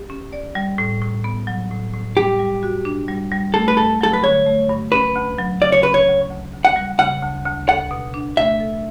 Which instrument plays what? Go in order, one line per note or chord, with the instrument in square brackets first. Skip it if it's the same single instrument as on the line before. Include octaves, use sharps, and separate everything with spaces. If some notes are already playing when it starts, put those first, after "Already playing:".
Already playing: [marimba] G4
C#4
D5
G3
A2
A2
B3
F#3
A2
A2
[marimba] G3 [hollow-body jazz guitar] G4
[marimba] G3
F#4
D4
G3
G3
[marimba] A3 [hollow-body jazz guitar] A4
[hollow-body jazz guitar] B4
[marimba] G2 [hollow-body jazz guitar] A4
[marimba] F#3 [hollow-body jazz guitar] A4
[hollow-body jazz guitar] B4
[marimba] D3 [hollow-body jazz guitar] C#5
[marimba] A3
G2
[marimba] C#4 [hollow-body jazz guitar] B4
[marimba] D2
F#3
[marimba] C#3 [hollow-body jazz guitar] D5
[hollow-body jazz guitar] C#5
[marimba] C#4 [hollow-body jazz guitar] B4
[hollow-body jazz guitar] C#5
[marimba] D2
D2
D2
[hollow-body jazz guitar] F#5
[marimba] G3
[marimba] C#3 [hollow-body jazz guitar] F#5
[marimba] D2
D2
[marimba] A4 [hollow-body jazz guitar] F#5
[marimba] B2
D4
[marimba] A3 [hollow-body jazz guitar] E5
[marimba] A4